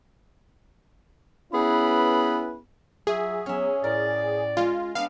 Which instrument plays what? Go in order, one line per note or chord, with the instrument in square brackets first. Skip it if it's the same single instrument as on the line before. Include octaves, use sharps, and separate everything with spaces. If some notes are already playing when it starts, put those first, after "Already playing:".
[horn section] B3 C#4 E4 G#4 B4 B5
[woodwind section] F#3 F4 E5 [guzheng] F#4 [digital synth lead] G#4
[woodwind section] F#3 B3 [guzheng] C#4 E5
[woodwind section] A2 D5 [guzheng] A#4
[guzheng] G#3 [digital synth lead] F4
[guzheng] B3 D4 [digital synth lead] F5